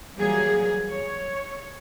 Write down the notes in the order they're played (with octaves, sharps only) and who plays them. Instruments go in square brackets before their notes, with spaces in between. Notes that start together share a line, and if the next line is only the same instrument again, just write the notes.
[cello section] E3 F#3 G3 A#3 G#4
C#5